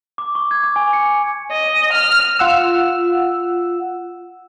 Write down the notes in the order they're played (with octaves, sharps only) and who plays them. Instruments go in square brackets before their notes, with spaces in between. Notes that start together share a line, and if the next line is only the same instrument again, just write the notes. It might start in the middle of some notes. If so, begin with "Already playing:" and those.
[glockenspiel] D6
C#6
G#6
D6
G#5
C#7
G#5
[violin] D#5
F6
[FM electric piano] F4 F#5 E6